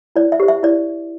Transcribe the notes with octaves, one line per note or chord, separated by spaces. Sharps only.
E4 D5
E5
G4 C5
E5
E4 D5